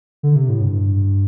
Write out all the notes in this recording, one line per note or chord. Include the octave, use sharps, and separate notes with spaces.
D3
C3
A2
G2